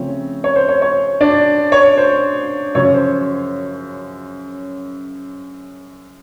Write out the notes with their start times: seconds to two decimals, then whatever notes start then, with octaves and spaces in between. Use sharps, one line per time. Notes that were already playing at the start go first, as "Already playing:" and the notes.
Already playing: C#3 F3 A3 C4 C#5
0.44 C#5
0.56 C5
0.69 C#5
0.82 C#5
1.21 D4 D5
1.72 C#5
1.98 C5
2.75 F#2 C#3 F3 C#5
2.94 C5